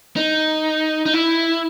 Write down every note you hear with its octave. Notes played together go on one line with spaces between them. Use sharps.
D#4
D#4
E4